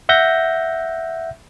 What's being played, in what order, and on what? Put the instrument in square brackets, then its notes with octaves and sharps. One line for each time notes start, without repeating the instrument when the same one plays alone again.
[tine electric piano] E5 F#5 G6 A#6